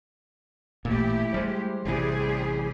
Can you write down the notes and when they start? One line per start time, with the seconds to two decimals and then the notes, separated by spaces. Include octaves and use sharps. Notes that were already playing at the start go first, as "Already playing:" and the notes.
0.85 A1 A#2 A3 E4 G4
1.34 G3 G#3 C5
1.85 A1 C3 E3 G3 G4 G#4